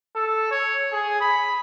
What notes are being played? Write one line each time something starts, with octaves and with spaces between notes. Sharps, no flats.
A4
C#5
G#4
B5